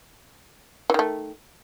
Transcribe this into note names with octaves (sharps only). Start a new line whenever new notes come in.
D#3 E3 A3